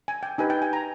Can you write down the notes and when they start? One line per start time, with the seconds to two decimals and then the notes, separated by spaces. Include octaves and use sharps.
0.08 G#5
0.23 G5
0.38 D#4 G4 B4 G#5
0.50 G5
0.62 G#5
0.73 A#5